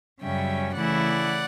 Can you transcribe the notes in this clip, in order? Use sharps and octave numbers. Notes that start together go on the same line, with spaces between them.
F#2 C#3 G3 C#4 E5 G5
C#3 E3 A3 E4 D5 F#5